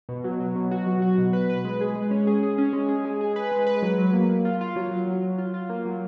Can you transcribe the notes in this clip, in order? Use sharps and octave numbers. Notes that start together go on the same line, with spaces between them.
B2
F#3
F#3
B2
F#4
F#3
F#4
B2
B4
B4
G#3
G#4
G#3
C#4
G#4
G#4
C#4
G#3
G#4
G#3
G#4
B4
G#3
B4
F#3
F#3
A#3
A#3
F4
F4
F#3
F#3
F#3
F#3
F4
F4
A#3
F#3